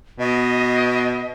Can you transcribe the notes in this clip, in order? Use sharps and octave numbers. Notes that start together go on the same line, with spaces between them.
B2 D#5